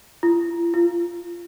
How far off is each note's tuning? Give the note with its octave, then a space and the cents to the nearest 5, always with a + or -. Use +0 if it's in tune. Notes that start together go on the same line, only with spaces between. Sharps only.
F4 -45
F4 -15